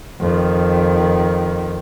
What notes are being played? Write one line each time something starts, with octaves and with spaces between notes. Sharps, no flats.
F2 D#3